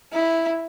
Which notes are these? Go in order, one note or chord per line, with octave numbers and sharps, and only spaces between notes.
E4